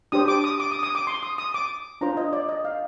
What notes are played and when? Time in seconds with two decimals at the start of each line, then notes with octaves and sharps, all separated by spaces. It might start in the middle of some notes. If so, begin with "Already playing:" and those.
0.12 D4 G4 C5 D#6
0.28 D6
0.44 D#6
0.60 D6
0.72 D#6
0.83 D#6
0.95 D6
1.07 C6
1.23 D#6
1.38 D#6
1.54 D6
2.01 D4 F4 C5 A#5
2.17 D#5
2.33 D5
2.49 D#5
2.65 F5